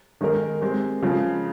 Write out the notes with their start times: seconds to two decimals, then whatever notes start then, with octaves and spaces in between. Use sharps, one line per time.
0.21 D#3 G#3 D#4 A#4
0.61 G#3 C4 G4
1.02 C#3 F3 G#3